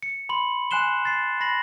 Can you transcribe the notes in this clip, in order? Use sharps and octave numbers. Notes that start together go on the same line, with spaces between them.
C#7
B5 C6 F#7
G#5 C6 F#6 C7 E7 G7
A6 C7
B5 A#6 C7 F#7